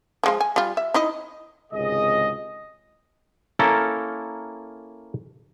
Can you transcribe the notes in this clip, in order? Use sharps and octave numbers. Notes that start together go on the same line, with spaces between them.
F3 G#3 F4
G#5
G3 F4
E5
D#4 E4 D#5
G#1 C#2 C3 G#4 D#5
A#3 C#4 E4 A4 A#4